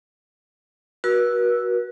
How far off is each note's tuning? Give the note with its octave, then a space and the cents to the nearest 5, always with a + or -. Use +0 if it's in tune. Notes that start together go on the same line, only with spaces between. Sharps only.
F#4 +0 B4 -45 E6 +0